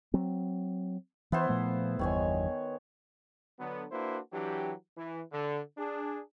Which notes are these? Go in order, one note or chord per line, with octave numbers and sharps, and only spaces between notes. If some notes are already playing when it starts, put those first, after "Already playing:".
F#3 C4
E3 B3 E4 C5
A#2 F3 A3
G1 E2 G2 D#3 C#5 G#5
D3 F#3 B3
A#3 D4 E4 F#4 B4 C5
E3 F#3 D4 G4
E3
D3
D4 G#4